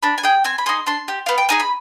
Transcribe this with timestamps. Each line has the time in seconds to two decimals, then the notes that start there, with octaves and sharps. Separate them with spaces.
0.03 D4 B5
0.18 G#5
0.23 G#4 G5
0.44 C4 G#5
0.58 B5
0.66 D#4 G#4 C6
0.86 D4 C6
1.08 G4
1.26 B3 F5
1.38 G5
1.49 D#4 G#4 G#5
1.60 B5